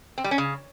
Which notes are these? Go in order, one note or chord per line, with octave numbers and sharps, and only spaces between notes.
C4
G3
C#4
C#3